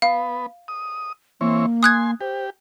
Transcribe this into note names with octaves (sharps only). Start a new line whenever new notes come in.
B3 F5
D#6
E3 A#3 C4 C#5
G#5 C6 D#6 F#6 G#6
G4 C5